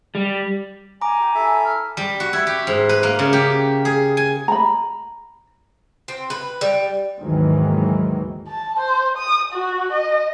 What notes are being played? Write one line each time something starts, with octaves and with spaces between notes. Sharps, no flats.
G3
G#5 A#5 D6
G4
E4 A4 E5
F6
G3
F#4
E4
G4
G#2
B4
A#3
C#3
G4
G#4
G#5
A#5 B5
C4
B4
G3
D#2 G#2 D#3 E3 F#3 G#3
A5
C5
D#6
F#4
D#5